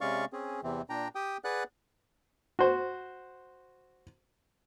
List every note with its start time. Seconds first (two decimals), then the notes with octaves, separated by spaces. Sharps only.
0.01 C3 G#3 C#4 D5 F5 C#6
0.33 C4 C#4 G#4
0.63 E2 C3 E3 C4
0.89 A#2 D4 G5 A#5
1.15 G4 G5 D#6
1.44 G#4 B4 D5 F#5 F#6
2.59 F#4 C5